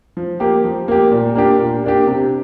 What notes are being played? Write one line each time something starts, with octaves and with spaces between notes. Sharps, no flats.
F3
A#3 G4
F3
A#3 G4
A#2
A#3 D4 G4
A#2
A#3 D4 G4
C3